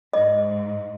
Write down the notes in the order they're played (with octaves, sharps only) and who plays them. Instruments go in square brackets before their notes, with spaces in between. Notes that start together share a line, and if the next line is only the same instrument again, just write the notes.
[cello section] G#2 [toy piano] D#5